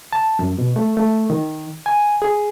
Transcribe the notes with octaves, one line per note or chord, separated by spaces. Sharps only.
A5
F#2
B2
A3
A3
D#3
G#5
G#4